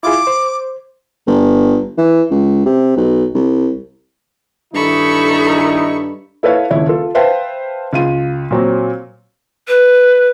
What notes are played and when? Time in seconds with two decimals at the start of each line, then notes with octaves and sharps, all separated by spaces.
0.03 E4 F4 G#4 D6
0.27 C5
1.27 G1
1.98 E3
2.31 C#2
2.65 C3
2.97 B1
3.35 C2
4.74 G2 D#3 D#4 E4 A4 B5 C#6
6.43 E4 A4 B4 C#5 F5
6.71 D#1 C#2 E4 C#5
6.87 F4 A4
7.15 B4 C5 E5 F5 G5 A5
7.93 C#2 F4 D#7
8.51 A#2 F#3 C4
9.68 B4